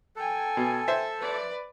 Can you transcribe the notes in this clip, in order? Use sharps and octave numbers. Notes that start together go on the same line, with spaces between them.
A4 G5 G#5
B2
C5 E5
B4 D5